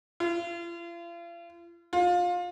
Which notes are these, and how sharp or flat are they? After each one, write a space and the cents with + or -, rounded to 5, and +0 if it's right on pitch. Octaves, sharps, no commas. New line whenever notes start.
F4 -40
F4 +25